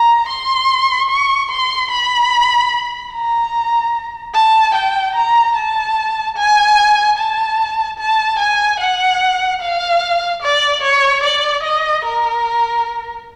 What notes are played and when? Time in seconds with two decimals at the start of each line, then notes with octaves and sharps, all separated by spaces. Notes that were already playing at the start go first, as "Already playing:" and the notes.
Already playing: A#5
0.29 C6
1.10 C#6
1.51 C6
1.91 B5
3.13 A#5
4.34 A5
4.75 G5
5.15 A#5
5.56 A5
6.37 G#5
7.18 A5
7.99 A5
8.39 G#5
8.80 F#5
9.61 F5
10.42 D5
10.83 C#5
11.23 D5
11.63 D#5
12.04 A#4